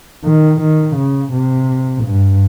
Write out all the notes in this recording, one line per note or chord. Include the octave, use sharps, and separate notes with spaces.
D#3
D#3
C#3
C3
G2